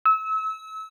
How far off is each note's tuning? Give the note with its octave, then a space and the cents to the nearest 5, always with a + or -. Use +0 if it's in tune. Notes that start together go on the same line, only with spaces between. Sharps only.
E6 -30